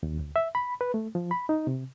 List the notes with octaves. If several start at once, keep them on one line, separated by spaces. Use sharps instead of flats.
D#2
D2
E5
B5
B4
A3
F3
B5
D#4
C3